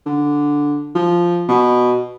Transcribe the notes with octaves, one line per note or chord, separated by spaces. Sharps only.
D3
F3
B2